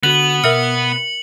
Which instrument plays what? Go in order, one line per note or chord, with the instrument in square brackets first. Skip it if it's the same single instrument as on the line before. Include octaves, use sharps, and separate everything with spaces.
[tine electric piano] D3 F#4 [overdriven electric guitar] B3 [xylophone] F#6 [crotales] F#7
[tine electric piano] B2 [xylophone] A#4 E5 F6 [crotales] C#7